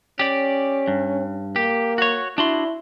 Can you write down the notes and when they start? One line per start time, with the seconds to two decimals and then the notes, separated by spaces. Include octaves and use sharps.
0.19 C#4 G4 D5
0.88 G2
1.56 A#3 G4
1.98 F#4 C#5
2.38 D4 E4 F#4 C6